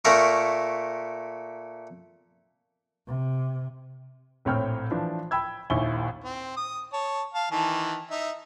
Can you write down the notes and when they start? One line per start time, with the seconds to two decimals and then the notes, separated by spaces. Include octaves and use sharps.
0.05 A#2 A3 A#4 C#6
3.07 C3
4.45 A#1 A2 C4 C#5 G5 F6
4.91 E3 F3 D4
5.31 G5 B5 E6 G#6
5.70 A#1 D#2 E4 G#5 C#6 G7
6.24 C4
6.56 D#6
6.93 C#5 A5
7.34 F5 A5
7.51 D#3 E3 A5
8.11 D#4 E5